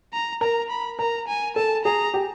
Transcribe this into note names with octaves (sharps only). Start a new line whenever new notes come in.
A#5
A#4 A#5
B5
A#4 A#5
G#5
A4 A5
G#4 A#5
G4